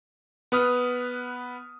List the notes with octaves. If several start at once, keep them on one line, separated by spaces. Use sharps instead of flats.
B3 B4 D#6 F6